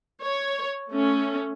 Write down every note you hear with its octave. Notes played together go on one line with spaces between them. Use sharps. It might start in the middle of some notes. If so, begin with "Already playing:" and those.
C#5
A3 C#4